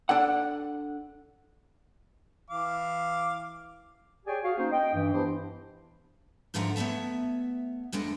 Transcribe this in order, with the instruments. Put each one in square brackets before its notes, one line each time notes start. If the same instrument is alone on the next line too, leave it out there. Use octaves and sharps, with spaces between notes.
[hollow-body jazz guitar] D4 A4 F#5
[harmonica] E3 F5 D6
[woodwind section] G4 G#4 C#5 D5 G5 G#5
F#4 G#4 F5
A#3 C#4 D#4 C5
D#5 G5
G2 E3
E3 B3 D4 E4 G4 C5
[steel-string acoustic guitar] G#2 D3 F3 E5 F#5 A#5
A3 B3 C#5 E5 A5
F2 D3 G#3 A3 D#5